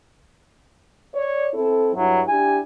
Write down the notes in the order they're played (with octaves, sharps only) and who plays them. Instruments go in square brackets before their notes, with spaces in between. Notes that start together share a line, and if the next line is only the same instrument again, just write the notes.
[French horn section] C#5 D5
C4 E4 A4
[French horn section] G2 E4 [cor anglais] F#3
[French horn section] D4 E4 G4 [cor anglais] G#5